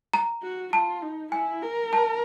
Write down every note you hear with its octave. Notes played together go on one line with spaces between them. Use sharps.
A#5
F#4
F4 A5
D#4
E4 G#5
A#4
A5